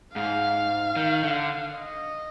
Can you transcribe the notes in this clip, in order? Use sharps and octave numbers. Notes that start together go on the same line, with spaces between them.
G#2 F5
D#3
D3
D#5